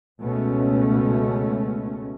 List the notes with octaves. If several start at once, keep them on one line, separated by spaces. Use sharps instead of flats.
C#2 B2 G#3 A3 C#4